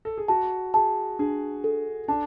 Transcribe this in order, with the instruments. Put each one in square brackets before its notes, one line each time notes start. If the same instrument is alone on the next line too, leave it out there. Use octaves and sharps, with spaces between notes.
[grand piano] A4
G#4
[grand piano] F#4 [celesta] A5
[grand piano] G#4 [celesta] A5
[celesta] D4 [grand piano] G#4
[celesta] A4
[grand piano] D4 [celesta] A5